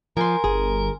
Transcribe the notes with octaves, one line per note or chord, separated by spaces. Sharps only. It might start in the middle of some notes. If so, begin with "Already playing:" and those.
F3 A#4 G#5 C6
G1 G#4